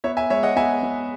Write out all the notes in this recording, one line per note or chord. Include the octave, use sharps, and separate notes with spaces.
B3 C#5 E5
E5 G#5
G#3 C#5 E5
D#5 F#5
B3 E5 G#5
B3